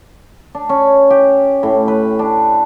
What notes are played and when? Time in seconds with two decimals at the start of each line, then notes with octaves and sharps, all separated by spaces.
0.55 D4
0.69 C#4
1.10 G4
1.63 A2
1.88 B4
2.19 D4